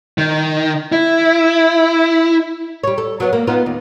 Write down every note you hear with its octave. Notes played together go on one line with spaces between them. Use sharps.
D#3
E4
G3 C#5
A4
F#3 B3
A#3
B3 D#4 F4
D#2